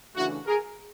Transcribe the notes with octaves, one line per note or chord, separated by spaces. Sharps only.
C#3 E3 A3 D4 E4 F#4
G#4 A#4